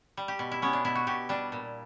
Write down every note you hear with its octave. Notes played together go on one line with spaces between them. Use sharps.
G3
G4
B2
E4
B3 C#4
D4
B2 E4
F#4
B2 G4
G3 D4
A#2